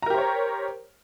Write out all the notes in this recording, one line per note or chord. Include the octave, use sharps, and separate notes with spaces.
G4 A#4 C5 C#5 A#5